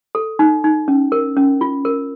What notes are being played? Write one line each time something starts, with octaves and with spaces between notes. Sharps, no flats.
A4
D#4
D#4
C#4
A#4
C#4
F4
A#4